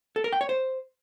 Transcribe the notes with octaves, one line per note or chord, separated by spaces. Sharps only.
A4
A#4
G5
C#5
C5